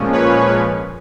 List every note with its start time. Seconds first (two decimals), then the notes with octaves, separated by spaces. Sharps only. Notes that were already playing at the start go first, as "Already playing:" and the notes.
Already playing: A#2 F3 G#3 C#4
0.13 B4 C#5